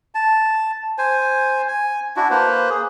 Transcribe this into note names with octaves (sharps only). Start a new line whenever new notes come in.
A5
C5 G#5
G#5
D4 E4 F#4
A#3 B4 C5
G#4